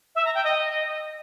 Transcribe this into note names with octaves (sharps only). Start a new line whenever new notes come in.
E5
A#5
G5
D#5